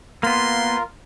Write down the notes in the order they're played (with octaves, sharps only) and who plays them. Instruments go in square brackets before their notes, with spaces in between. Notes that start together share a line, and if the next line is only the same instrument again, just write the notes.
[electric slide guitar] A#3 B3 [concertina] F4 A#4 [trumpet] C6